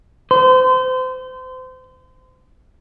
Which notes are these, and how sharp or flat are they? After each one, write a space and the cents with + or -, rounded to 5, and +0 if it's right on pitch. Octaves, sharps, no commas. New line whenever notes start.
C5 -30